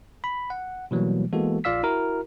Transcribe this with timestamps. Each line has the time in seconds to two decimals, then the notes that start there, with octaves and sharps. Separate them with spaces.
0.24 B5
0.50 F#5
0.91 B2 E3 F#3 G3 A#3
1.33 E3 G#3 A#3 B3 F#4 A4
1.64 A#1 F4 D5 F5 E6 B6
1.83 E4 F#4 A#4